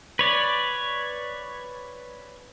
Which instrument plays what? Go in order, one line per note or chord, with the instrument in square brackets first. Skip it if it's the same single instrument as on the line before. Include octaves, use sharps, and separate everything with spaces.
[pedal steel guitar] B4 C#5 D5